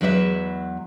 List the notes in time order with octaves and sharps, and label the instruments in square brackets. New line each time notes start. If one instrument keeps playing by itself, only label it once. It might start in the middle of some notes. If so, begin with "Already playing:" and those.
[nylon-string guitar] E2 F#3 G#3 B4 D5 E5